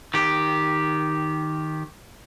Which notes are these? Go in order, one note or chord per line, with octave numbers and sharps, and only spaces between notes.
D#3 G4